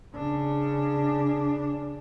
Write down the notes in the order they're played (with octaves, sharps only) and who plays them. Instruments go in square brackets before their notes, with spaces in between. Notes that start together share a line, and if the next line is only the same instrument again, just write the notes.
[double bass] C#3 D4